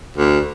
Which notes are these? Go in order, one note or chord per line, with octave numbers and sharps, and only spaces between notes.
D2